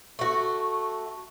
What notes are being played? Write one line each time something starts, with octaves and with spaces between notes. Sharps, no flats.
A3 F#4